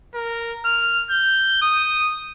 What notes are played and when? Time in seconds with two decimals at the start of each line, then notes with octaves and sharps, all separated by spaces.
0.14 A#4
0.65 F6
1.11 G6
1.62 D#6